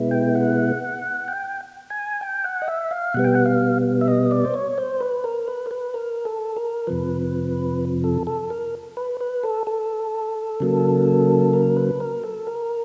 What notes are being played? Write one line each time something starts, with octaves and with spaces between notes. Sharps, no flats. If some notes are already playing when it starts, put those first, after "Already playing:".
Already playing: B2 G#3 B3 E4
G5
F#5
G5
G#5
G5
F#5
D#5
E5
F5
B2 G3 B3 F#5
G5
F#5
F5
E5
D#5
D5
C5
C#5
C5
B4
A#4
B4
A#4
B4
A#4
A4
A#4
F2 C3 F3 B4
A4
A4
A#4
B4
B4
A4
A4
C#3 F#3 A#3
A#4
B4
A#4
A4
A#4